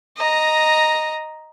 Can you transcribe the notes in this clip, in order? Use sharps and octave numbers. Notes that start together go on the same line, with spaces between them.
D#5 A#5